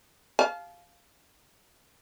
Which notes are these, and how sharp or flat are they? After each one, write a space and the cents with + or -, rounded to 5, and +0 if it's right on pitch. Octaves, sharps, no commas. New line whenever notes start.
F5 +0 A5 -35